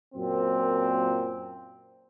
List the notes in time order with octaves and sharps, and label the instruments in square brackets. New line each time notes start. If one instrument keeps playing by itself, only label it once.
[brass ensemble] F#2 A#2 C4